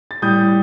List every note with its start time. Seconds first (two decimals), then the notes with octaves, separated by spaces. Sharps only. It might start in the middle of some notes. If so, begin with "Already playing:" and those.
0.11 A6
0.22 A2 G3 D#6 G6